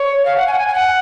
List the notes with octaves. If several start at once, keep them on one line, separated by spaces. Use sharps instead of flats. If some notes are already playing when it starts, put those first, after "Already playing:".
Already playing: C#5
F5
F#5
G#5
F#5
G#5
G#5
F#5